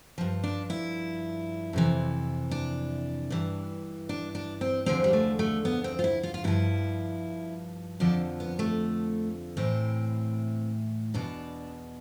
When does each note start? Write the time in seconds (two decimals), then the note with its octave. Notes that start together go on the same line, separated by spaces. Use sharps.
0.18 G2 F3
0.44 D4
0.70 E4
1.73 F2 C3 E3
2.51 D4
3.30 G2 E3
4.09 D4
4.35 D4
4.61 C4
4.86 E2 D3 F3 C4
5.04 G3
5.13 A3
5.39 A3
5.65 B3
5.84 C4
5.99 F4
6.04 E4
6.23 F4
6.34 F4
6.44 G2 F3 E4
8.00 F2 D3 F3 D4
8.40 B3
8.59 A3
9.57 A2 E3 C4
11.14 E2 B2 D4